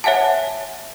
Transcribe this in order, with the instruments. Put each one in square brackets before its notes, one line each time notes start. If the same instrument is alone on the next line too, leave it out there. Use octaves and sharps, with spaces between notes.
[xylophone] C#5 E5 F#5 G#5 A5